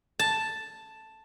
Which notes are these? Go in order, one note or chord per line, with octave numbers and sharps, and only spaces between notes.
A5